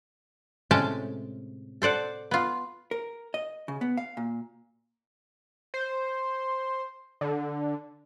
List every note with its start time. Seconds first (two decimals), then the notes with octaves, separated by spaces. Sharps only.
0.71 A2 C3 G#3 C#4 G5 A5
1.82 A4 C5 D5 F#5
2.31 B3 F4
2.91 A#4
3.34 D#5
3.68 C#3
3.81 B3
3.97 F5
4.17 A#2
5.74 C5
7.21 D3